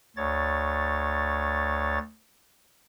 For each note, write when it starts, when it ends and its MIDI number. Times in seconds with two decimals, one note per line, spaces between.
0.16 1.99 38
0.16 1.99 73
0.16 1.99 93